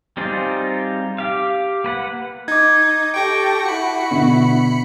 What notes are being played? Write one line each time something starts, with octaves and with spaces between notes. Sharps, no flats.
G3 C4 D#4 F4 G#4
G4 F5
A#3 B4 F#5
D#4 D6 G#6
G4 A4 G5 C#6 A#6 D7
E4 F#4 B5 C#7
B2 D3